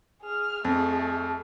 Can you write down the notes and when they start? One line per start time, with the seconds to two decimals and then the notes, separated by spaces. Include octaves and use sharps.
0.21 G#4 F6
0.65 F2 A3 G#4